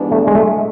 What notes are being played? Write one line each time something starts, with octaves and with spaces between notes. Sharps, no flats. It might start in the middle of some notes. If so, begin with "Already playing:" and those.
Already playing: G#2 E3 G3 B3 D4
A3
G#3
A3